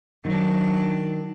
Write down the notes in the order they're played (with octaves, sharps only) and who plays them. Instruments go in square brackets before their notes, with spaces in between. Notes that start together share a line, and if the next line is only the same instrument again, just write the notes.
[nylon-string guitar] D#3 [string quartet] F#3 D4